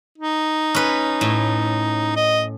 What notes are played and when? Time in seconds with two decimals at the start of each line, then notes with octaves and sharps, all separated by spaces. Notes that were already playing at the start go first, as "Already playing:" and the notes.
0.18 D#4
0.75 C#4 B4
1.21 A2
2.16 D#5